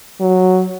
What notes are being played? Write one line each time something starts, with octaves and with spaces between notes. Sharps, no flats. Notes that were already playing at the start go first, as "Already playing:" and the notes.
F#3